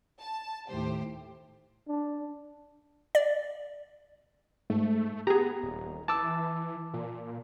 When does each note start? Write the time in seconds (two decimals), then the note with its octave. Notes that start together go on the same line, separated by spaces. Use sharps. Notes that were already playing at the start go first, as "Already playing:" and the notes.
0.20 A5
0.70 D#2 A2 G4 C5
1.88 D4
3.15 D5
4.70 G#2 A3
5.27 B3 G4 G#4 A#5
5.63 D#1
6.08 E3 A5 D6 E6
6.93 A#2